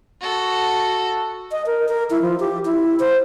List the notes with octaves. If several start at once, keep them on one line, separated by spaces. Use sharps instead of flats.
F#4 A4
D#5
A#4
A#4
E4
F3
G4
E4
C5